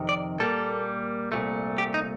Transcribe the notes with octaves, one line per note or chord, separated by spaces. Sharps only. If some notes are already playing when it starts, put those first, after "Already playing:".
Already playing: F2 C3 D#3
D5
A#2 G3 A#3 A4
C2 A#2 A3
G4
D#4